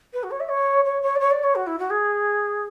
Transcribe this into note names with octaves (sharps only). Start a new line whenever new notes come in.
B4
F#4
C#5
E5
C#5
C#5
C#5
D5
C#5
D5
C#5
F#4
E4
F#4
G#4